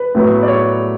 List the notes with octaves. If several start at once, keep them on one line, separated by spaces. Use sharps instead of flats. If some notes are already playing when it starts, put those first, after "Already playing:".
Already playing: B4
A2 F#3 B3
D5
C#5